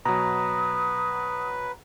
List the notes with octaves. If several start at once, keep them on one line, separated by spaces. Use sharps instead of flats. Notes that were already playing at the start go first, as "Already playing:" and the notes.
B2 F#3 B4 A#5 D#6